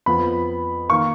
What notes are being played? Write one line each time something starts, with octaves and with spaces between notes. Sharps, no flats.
F2 F3 B3 B5
D#3 A#3 C#6